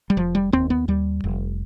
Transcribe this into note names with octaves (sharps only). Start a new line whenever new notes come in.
G3
F1 F3
G3
D#2 C4
B3
D#2 G3
F1